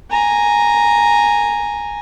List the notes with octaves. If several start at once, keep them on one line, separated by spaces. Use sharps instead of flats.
G#5 A#5